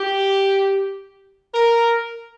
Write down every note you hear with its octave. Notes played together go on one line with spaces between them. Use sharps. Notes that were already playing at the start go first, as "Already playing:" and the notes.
Already playing: G4
A#4